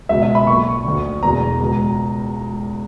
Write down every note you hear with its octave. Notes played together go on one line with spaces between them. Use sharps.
C#2 B2 E5
E5
B5
B1 A#2 C#6
D2 D3
E1 E2 B2 A#5
C#2 B2